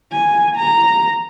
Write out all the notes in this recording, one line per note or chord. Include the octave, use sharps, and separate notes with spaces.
G#5
A#5